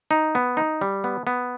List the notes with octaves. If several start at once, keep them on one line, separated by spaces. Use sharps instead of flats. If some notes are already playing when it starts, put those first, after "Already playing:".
D#4
B3
D#4
G3
B3
B3